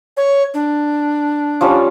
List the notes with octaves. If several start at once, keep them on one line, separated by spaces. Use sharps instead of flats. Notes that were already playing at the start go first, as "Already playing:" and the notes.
C#5
D4
F3 G3 C#4